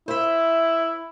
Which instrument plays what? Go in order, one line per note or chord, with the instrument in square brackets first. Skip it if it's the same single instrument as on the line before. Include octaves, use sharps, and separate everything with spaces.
[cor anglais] E4 [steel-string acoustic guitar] C5 E5